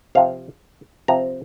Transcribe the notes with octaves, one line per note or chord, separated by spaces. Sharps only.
C3 F3 C4 F5
C3 F3 C4 A#5